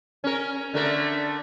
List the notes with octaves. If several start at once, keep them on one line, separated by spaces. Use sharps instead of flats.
C#4 A#4
D3 A3 A#4